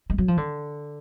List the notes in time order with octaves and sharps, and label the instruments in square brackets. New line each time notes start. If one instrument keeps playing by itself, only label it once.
[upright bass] G#3
F#3
F3
D3